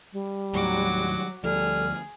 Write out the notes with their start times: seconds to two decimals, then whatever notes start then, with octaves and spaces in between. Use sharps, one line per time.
0.13 G3
0.53 D#2 A2 D#3 F#3 F#4 D6
1.44 D2 F3 G3 G#4 A4 F6